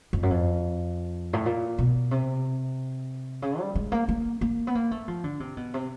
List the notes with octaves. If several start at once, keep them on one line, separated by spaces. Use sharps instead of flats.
F2
F#2
F2
A2
A#2
B2
C3
C#3
G3
G#3
A#3
A#3
A#3
B3
A#3
A3
F3
D3
C3
B2
C3